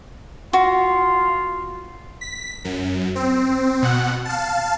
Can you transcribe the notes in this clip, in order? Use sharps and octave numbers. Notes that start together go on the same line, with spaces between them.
F4 F#4
B6
F#2
C4
B2 F#5
F5 A5